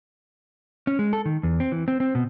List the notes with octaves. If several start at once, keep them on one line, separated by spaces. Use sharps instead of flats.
C#4
G#3
A4
D#3
E2
C4
E3
C4
C4
B2